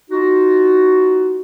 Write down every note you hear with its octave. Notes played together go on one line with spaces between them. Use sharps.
D#4 F4 F#4